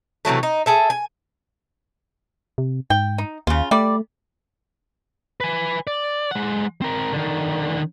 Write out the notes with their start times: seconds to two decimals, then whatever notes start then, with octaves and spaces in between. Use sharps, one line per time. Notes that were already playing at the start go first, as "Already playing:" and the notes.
0.25 C3 E3 F#3 A3
0.43 D#4
0.66 G#4 A4 E5
0.90 G#5
2.58 C3
2.90 G#2 G5
3.18 D#4
3.47 D#2 C#3 F4
3.71 G3 A3 D5
5.41 B4 G#5
5.87 D5
6.31 G#3 F#5
6.82 C4 A#4
7.13 D3 D#3